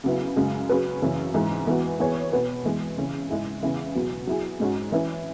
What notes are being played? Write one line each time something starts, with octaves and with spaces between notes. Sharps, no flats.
C#3 F#3 B3 E4
F#2 C#3 G#3
F#3 C#4 G#4 B4
F#2 C#3 E3 C#4
G#2 E3 G#3
E2 E3 B3 F#4
E3 B3 G#4 C#5
B2 B3 F#4 B4
E2 E3 G#3
C#3 E3 C#4
G#2 G#3 E4 G#4
E2 C#3 E3 C#4 E4
E2 B2 F#3
F#3 E4 G#4
G#2 G#3 C#4 F#4
E3 C#4 E4 B4